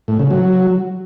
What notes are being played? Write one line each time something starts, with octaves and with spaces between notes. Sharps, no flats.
A2
C#3
F#3